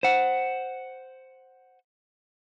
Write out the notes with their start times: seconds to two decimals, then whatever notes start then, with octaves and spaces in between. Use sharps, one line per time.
0.03 C5 F#5